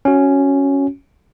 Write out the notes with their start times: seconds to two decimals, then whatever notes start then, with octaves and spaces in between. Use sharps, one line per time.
0.05 C#4 F#4